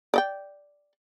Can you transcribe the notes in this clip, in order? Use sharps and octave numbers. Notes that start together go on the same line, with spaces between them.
D5 D#5 G5